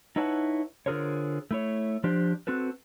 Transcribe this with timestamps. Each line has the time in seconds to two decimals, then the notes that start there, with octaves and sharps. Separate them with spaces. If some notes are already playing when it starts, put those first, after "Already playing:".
0.16 D#4 E4 B4 C#5 F#5 A5
0.86 D3 F4 G#4 A#4 C5 C#5
1.51 A3 E4 C#5
2.04 F3 D4 G4 C5 D5
2.47 C4 F#4 A4 B4